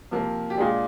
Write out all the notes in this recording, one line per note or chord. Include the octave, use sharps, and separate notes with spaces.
C3 F3 A#3
G4
A#2 G#3 D4 G#4